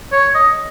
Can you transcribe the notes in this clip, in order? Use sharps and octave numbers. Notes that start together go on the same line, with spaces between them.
C#5
D#5